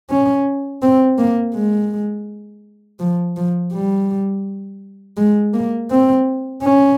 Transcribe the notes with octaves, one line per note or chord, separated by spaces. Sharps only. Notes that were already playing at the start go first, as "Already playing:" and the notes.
C#4
C4
A#3
G#3
F3
F3
G3
G#3
A#3
C4
C#4